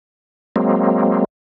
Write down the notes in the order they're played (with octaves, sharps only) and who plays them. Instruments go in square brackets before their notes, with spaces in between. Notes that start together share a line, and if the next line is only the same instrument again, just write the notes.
[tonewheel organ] F#3 G#3 A#3 C4